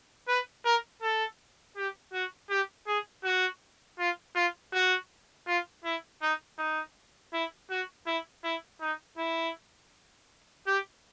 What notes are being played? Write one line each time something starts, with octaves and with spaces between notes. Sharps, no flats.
B4
A#4
A4
G4
F#4
G4
G#4
F#4
F4
F4
F#4
F4
E4
D#4
D#4
E4
F#4
E4
E4
D#4
E4
G4